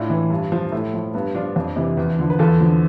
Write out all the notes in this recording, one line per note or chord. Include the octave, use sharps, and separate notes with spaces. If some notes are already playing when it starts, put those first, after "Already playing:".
Already playing: A2 D4 F4
E3
G2
F3
A2 A3
F3
G2 B3
F3 D4 F4
F2
C3 E3
E2
D3 F3
B4
E2 F4 A4
D3 F3